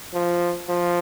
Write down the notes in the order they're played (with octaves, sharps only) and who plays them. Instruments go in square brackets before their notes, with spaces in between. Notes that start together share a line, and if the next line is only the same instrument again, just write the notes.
[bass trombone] F3
F3